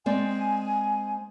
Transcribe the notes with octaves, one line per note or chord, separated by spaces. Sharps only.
G#3 C4 D5 G#5